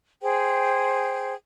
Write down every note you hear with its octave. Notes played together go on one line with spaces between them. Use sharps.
G#4 C5 G5